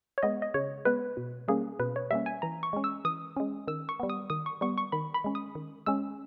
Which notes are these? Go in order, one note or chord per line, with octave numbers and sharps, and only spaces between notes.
C#5
G#3 B3 D#5
D#5
C#3 C#5
G#3 B3 B4
B2
G3 A#3 C#4 G#4
B2 B4
C#5
G3 A#3 C#4 E5
G#5
E3 A#5
C#6
G#3 C#4
E6
E3 D#6
G#3 C#4
D#3 E6
C#6
G3 B3
D#6
D#3 D#6
C#6
G3 B3 C#6
C#6
D#3 B5
B5
G#3 C#4
D#6
D#3
G#3 C#4 E6